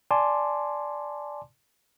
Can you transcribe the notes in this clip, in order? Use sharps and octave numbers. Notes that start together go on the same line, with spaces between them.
D5 G#5 A5 C6 D6